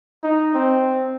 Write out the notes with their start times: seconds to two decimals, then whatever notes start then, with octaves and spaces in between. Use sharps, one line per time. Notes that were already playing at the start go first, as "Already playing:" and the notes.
0.23 D#4
0.54 C4